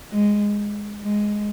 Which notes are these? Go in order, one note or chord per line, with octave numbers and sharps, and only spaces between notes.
G#3
G#3